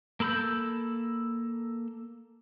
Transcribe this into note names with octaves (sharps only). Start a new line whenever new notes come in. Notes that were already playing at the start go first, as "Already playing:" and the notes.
A#3 A4 B5 E6 G6